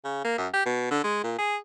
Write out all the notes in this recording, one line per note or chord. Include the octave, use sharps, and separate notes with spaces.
C#3
A#3
F#2
G4
B2
D3
G#3
A#2
G#4